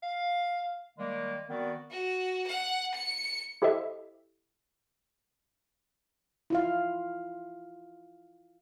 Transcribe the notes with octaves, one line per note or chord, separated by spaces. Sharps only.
F5
D#3 G3 G#3 A#3
D#3 B3 C4 F#4 D5
F#4
F#5
C#7
E4 G4 A4 C5 D#5 E5
E4 F4 F5